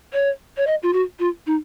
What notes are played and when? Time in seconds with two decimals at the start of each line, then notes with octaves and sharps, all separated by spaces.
0.13 C#5
0.57 C#5
0.67 D#5
0.83 F4
0.93 F#4
1.19 F4
1.47 D#4